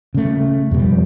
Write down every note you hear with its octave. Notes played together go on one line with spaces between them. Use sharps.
C#3 A3
F2 B2 G3